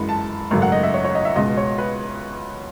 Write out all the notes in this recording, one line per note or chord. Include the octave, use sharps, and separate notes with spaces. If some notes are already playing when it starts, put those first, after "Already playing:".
Already playing: F#2 E3 G#3 B5
A5
G#1 F#2 C#3 F#3 A3
F#5
D#5
E5
C#5
C#5
D#5
E5
C#2 B2 G#3 D#5
C#5
B4